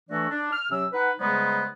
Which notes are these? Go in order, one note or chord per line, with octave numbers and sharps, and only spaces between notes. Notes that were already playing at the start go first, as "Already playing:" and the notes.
E3 A3 D4 F#4 A4 D5
D4
F6
C3 F#3 C#4 E6
D#4 B4 F#5
C#3 G3 G#3 B3 D#4 C5